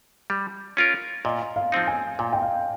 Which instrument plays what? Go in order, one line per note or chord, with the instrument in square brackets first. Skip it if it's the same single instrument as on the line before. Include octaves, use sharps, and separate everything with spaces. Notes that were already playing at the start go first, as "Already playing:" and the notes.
[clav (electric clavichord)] G3
C#4 F4 A#4
[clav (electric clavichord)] A#2 [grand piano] D#5
[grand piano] F5
[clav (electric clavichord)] F3 C4 D#4
[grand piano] G#5
[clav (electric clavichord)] A#2 [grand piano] G#5
[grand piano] G5
F5